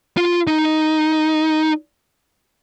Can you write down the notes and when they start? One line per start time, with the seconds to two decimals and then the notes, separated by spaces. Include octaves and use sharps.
0.17 F4
0.47 D#4